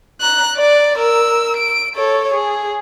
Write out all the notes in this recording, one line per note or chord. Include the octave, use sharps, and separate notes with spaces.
A#5 F#6
D5
A#4 E6
D7
A4 C#5
G#4